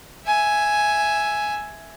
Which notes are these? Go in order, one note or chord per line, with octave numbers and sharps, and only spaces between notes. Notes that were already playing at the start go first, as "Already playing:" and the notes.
E5 G#5